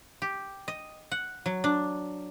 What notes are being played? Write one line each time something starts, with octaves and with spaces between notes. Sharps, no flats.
G4
D#5
F#5
F#3
D4